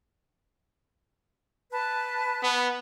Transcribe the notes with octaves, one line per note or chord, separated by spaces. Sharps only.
B4 A5 F#6
B3